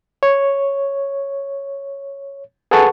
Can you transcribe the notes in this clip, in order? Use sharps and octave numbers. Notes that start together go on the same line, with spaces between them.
C#5
G#4 A4 B4 F#5 A5 C#6